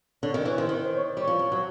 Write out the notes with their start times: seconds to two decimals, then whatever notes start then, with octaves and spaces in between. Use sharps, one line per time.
0.22 D3 C#5
0.34 D#3
0.45 E3 C#5
0.57 D#3 C5
0.69 D#3 B4
0.82 C5
0.93 C#5
1.05 D5
1.16 G3 C#5
1.27 F3
1.39 F3
1.52 F#3